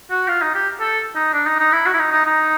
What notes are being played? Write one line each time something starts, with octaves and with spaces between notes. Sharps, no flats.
F#4
F4
D#4
G4
A4
D#4
D4
D#4
D#4
E4
F#4
E4
D#4
D#4
D#4